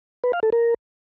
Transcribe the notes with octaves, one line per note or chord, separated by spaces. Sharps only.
B4
F5
A4
A#4